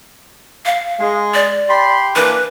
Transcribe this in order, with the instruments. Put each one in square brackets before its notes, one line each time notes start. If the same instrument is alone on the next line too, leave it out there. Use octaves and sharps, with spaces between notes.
[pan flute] F5
[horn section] G#3
[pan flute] D5
[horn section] G4 B5 C6
[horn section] E3 A#3 D4 [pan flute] B4